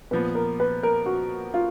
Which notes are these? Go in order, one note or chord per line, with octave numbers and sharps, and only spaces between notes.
A#2 F3 B3 B4
A#4
B4
A#4
F#4
F4